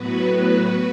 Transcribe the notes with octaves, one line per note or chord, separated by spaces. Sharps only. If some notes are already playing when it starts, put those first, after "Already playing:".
Already playing: A2 F#3 B3 F#4 B4
F#4 B4